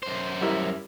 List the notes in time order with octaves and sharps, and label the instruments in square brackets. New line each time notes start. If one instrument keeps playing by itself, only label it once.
[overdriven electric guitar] F#2 C5
[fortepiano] G3 E4 A#4